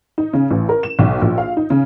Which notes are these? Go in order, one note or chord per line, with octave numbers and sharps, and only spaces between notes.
D#4
C#3
A1
A#4
E7
B1
A#1
F5
D#4
C#3